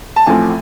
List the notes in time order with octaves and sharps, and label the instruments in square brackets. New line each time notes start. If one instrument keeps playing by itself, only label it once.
[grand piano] A5
A1 A2 F3 A3 C4 G#5